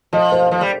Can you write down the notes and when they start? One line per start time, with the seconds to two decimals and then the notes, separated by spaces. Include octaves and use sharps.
0.13 F3 D#5
0.32 C5
0.51 F3 C5
0.61 G3